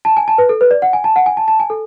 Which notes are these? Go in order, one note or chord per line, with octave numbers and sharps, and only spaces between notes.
A5
G#5
A5
B4
A4
B4
D5
F#5
G#5
A5
F#5
G#5
A5
A5
G#5
A4